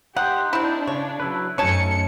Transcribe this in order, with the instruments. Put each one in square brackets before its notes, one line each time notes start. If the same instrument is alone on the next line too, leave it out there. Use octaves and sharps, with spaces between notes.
[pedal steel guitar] D#4 C5 [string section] G4 [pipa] F#5
[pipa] C4 E4 [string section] D4
[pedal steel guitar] C#3 [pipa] C#5
[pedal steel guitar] F#3 E4 B4
[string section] F#2 A3 C#7 [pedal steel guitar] C#4 D#4 G#5 [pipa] C#5 A5